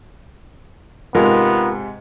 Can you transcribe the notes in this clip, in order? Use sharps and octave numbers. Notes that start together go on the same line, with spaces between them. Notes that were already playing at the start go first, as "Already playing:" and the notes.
G#2 C3 B3 F4 A#4